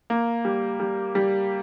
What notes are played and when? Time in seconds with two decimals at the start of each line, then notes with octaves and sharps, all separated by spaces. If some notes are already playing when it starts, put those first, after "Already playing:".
0.10 A#3
0.45 G3
0.80 G3
1.15 G3